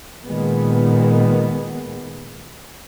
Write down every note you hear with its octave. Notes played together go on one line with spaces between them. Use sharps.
A#2 D#3 G#3 B3